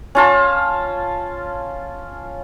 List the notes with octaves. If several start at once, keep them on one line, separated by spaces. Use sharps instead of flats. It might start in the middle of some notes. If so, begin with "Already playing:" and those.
C#4 F4 A5